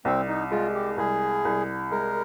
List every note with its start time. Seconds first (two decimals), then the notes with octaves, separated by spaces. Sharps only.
0.05 C2 C4
0.28 D#4
0.51 G#3 F4
0.74 G4
0.98 C2 G#4
1.45 C2
1.91 G#3 A#4